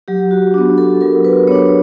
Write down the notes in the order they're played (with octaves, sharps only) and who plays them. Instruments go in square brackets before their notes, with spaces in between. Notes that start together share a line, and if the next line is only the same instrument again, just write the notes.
[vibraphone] F#3 G4
F#4
B3 D4 F#4
A4
F#3 A#4
B4
B3 D4 C#5